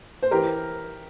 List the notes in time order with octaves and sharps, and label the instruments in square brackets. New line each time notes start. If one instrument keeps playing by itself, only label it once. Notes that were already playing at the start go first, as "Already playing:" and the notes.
[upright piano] C5
E3 G4 A#4